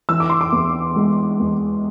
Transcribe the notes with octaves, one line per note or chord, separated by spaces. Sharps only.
E3 E6
D6
C6
D6
E2
G#3
E2